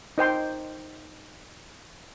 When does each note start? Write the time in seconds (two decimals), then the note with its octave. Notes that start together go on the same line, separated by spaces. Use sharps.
0.18 D#4 C5 G5 C6